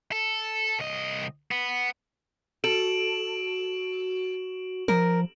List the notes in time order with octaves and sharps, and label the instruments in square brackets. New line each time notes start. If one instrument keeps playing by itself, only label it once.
[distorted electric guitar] A4
C2 D#5
B3
[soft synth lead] F#4 [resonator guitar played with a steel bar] A4 [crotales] D7 E7 F#7
[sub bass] F3 [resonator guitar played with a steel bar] A#4